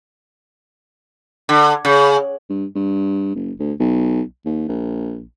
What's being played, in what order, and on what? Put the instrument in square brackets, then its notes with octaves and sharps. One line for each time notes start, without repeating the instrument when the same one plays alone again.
[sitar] D3
C#3
[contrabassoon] G2
G2
F#1
D2
B1
D#2
A#1